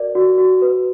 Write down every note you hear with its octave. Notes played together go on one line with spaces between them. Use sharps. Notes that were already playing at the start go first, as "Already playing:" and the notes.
Already playing: F#4 A#4 D5
F#4
F#4
B4